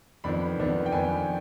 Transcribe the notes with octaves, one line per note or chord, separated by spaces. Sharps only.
F2 D#3 B3 D4 B5
F2 D#3 B3 D4
G5
F2 D#3 B3 D4 G#5